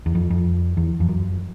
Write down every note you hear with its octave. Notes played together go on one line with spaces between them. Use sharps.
E2
F2
F2
E2
F2
F#2